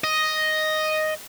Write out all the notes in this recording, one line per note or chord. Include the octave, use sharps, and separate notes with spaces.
D#5